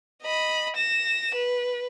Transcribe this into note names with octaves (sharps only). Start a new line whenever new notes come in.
D#5 B5
A#6 E7
B4